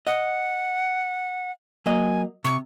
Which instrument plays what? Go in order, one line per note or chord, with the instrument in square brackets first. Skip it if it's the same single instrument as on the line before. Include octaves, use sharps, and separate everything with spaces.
[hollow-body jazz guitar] D#5 [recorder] F#5
[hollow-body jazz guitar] F#3 A#3 D#5 [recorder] G#5
[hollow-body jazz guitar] C3 [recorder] C#6